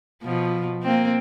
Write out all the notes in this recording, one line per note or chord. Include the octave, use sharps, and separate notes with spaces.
B2 F3
A#3 C4